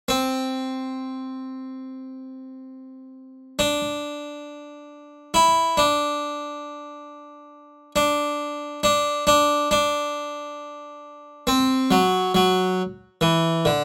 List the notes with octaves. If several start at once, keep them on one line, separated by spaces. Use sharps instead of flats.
C4
D4
E4
D4
D4
D4
D4
D4
C4
F#3
F#3
E3
D3